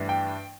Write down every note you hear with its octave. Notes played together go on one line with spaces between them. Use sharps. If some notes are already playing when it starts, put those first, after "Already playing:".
Already playing: G2 E3 A3 D4
G5